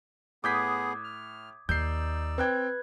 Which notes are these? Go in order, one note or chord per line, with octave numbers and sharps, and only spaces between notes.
A2 B3 G#4 D6 D#6 G6 G#6 B6
F6
D#2 D#4 D5 E6 G6 C7
C4 B4 G5 F#6 G#6